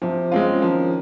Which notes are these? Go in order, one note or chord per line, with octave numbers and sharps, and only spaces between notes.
C3 F3
C#3 G#3 C4 F4
D#3 F3